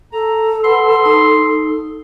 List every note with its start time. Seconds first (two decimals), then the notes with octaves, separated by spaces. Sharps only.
0.13 A4 A#5
0.64 B4 F#5 B5 C6
1.05 D#4